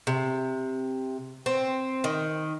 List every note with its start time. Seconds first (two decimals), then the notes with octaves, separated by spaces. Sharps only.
0.07 C3
1.46 C4
2.04 D#3